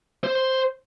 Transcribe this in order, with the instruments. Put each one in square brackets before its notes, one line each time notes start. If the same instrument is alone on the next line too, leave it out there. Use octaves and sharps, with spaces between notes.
[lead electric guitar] C5